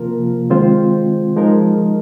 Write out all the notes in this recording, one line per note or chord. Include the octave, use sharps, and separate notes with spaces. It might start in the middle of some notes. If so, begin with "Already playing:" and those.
Already playing: C3 F3 A#3 F4 A#4
D#3 G#3 C4 F4 C5
F3 G#3 D#4 A#4